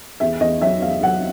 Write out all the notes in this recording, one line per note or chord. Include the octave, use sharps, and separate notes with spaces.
E2 E5
E2 D#5
F#3 E5
E2 F5
F#3 F#5